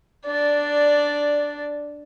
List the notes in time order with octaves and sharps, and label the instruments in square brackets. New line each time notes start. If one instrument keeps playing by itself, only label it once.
[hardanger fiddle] D4 D5